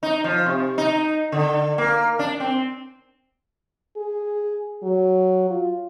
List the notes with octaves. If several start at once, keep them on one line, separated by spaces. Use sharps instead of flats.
D#4
F3
C3
D#4
D3
A#3
D4
C4
G#4
F#3
F4